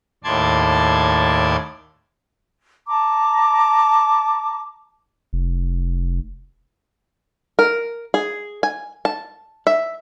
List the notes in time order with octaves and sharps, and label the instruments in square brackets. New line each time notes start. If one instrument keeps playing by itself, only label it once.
[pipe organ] D#2 A2 D5 A5 C6 G#6
[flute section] A5 A#5 D6
[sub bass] F1
[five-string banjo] A#4
G#4
G#5
A5
E5